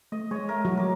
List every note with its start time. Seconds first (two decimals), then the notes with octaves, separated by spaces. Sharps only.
0.12 A3 D#5
0.31 G#3 C#5 D#5
0.49 A3 A#4
0.65 F#3 F#4
0.77 A#4 D6